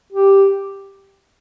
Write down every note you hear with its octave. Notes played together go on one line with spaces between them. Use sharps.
G4